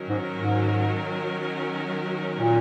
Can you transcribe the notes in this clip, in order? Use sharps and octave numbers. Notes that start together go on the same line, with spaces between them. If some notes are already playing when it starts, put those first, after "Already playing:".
Already playing: D#3 F#3 C#4 F#4 A#4
G#2
G#2
A#2